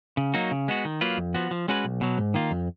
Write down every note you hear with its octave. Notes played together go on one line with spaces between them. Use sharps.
C#3
F#3 A#3 D#4 F#4
C#3
G#3 B3 F#4
D#3
F#3 A#3 F4 B4
F2
F3 B3 F#4
F3
G#3 C#4 F#4 B4
B1
B2 F#3
G#2
D#3 A#3 F4
F2